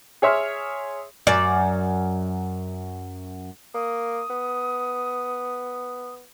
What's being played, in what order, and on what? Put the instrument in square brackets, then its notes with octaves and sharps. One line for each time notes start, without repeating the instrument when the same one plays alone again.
[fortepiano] G#4 C#5 E5 C6 F6
[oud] F#2 D5
[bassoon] A#3 [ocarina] D#6
[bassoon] B3